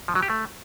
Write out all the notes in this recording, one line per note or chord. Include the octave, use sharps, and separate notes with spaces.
F3
F#3
G4
A3